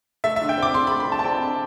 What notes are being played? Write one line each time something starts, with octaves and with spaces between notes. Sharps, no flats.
A3 E5
E5
D3
G5
C4 D6
D3 C6
B5
A3
B5
D3 A5
A5
C4 G5
D3